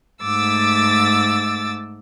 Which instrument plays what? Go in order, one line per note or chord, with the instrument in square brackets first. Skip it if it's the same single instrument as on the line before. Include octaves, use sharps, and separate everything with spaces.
[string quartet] G#2 A3 D6 E6 A6